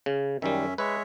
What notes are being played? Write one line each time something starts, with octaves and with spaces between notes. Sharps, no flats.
C#3
F#2 D#3 G3 C#4 E5
G#3 B4 C#5 E5